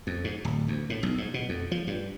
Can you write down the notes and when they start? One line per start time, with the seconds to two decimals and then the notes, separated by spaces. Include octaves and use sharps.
0.07 F2
0.24 G#2
0.45 D1
0.68 D2
0.90 A2
1.03 B1
1.18 G#2
1.34 B2
1.49 F2
1.72 F3
1.87 G2